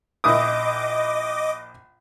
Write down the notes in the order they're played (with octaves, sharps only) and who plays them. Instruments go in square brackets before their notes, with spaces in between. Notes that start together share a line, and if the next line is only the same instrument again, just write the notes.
[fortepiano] A#1 E4 D#6 [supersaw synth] D#5 D6